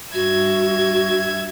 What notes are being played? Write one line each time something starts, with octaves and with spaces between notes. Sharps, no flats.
G2 F#4 E5 G#6